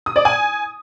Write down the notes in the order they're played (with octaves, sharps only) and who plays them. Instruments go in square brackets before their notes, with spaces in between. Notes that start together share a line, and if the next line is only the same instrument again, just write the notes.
[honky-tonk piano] D#6
D5
G#5